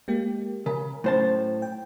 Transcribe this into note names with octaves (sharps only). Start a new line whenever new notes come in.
G#3 A#3 G4
C#3 A#4
A2 F#3 C#4 C5 A5
G5